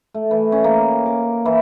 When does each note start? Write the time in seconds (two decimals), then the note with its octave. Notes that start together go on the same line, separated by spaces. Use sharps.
0.14 A3
0.31 E3
0.52 C#4
0.64 A#3
1.06 D6
1.46 E3